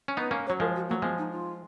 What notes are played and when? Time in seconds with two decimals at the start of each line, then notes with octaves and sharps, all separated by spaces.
0.08 C#4
0.17 B3 D#4 B4
0.31 A#3 C#4
0.46 C#5
0.50 F#3
0.60 F3 G#3 A#4
0.74 F#4
0.88 A#3
0.91 F#3
1.02 F3 G#3 B3
1.17 D#4
1.31 F4